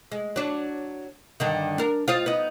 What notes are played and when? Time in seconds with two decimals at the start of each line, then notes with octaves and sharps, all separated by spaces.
0.12 G#3
0.36 F#3 D4
1.40 G2 D3 D#3
1.78 D4 A#4
2.08 F4 C5 D#5
2.26 B3 D#4